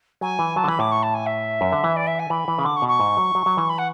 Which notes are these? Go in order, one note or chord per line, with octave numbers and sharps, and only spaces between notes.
F#3 G#5
E3
F#3 A5
D3
E3 B5
A2 D6
C#6
A5
G#5
E5
F#2
D3
E3
D5
E5
G#5
E3 B5
E3
C#3
D3 D6
C#6
B2
C#6
G#2
F#3
F#3
F#3
E3
B5
F#5